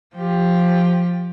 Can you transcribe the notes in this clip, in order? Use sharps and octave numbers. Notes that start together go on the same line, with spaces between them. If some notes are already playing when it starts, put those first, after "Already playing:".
F3 G4